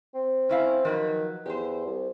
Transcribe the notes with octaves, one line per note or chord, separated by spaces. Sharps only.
C4
C#4 E4 F5
D#3 F3 F#3 B4
E2 G4 C5
C2